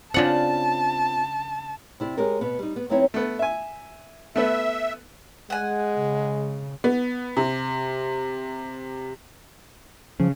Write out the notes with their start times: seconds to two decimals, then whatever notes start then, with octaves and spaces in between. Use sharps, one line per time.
0.14 C#3 C4 D4 F4 F#5 A5
2.00 C3 E4 D5
2.17 G#3 C#4 G4 A#4
2.41 B2 B3
2.59 G3 D#4
2.76 B3
2.90 F#3 B3 C4 D#4 E4 C#5
3.14 A3 B3
3.39 E5 G#5
4.36 A3 B3 B4 E5
5.50 G#3 F#5 G#5
5.98 C#3
6.84 B3
7.37 C3
10.20 C#3 F3